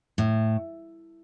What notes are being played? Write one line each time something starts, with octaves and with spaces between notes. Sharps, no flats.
A2